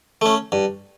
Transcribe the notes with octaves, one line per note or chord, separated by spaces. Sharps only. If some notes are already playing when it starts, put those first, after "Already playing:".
A3 C#4
G2